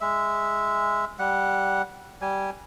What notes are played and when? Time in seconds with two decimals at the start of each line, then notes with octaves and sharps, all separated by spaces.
0.01 G#3 E5
1.19 G3 F#5
2.21 G3 G#5